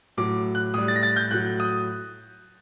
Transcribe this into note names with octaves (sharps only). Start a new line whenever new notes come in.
A2 F#3 D6
F#6
A2 G3 D#6
A6
A#6
A6
G6
A2 F#3 F#6
D#6